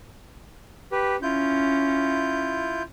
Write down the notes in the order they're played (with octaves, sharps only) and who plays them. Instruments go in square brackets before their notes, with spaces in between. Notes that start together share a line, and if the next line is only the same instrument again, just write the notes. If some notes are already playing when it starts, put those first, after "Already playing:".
[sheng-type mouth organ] G4 B4
[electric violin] C#4 [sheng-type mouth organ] E4 F4 G6